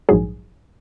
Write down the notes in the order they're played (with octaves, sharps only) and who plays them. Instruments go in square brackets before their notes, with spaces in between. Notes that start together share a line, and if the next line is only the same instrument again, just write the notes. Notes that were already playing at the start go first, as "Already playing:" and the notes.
[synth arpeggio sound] A#1 G#2 F#3 G#4